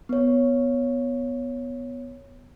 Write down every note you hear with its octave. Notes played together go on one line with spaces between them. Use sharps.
B3 C#5